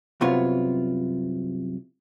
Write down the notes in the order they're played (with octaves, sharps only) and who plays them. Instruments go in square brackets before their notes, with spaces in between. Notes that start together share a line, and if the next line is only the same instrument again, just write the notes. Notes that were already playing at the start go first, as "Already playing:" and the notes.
[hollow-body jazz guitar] C2 F#2 C3 B3 F4 C#5